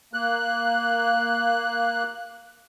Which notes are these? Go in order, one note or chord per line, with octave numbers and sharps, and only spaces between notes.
A#3 F#6